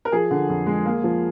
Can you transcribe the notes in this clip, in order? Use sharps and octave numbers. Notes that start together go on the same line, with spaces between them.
A#4
F3 G#4
D3
F2
G#3
A#3
F3